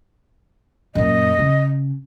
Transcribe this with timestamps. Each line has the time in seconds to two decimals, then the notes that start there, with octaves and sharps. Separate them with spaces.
0.95 F#2 A#2 D#5
1.39 C#3